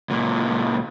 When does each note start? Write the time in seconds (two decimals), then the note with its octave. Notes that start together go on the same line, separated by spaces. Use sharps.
0.10 C#2 A#2